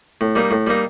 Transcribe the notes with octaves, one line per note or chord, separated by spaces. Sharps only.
A2
G3 A#3 D#4
A2
G3 A#3 D#4